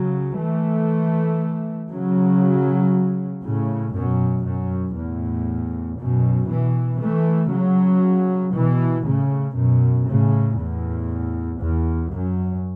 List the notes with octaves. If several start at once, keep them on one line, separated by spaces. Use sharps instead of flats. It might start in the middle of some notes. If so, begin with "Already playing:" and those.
Already playing: C#3 F#3
E3 A3
C#3 F#3
A2 C#3
F#2 B2
F#2
E2 A2
F#2 B2
B2 E3
E3 A3
C#3 F#3
B2 E3
A2 C#3
F#2 B2
A2 C#3
E2 A2
E2
F#2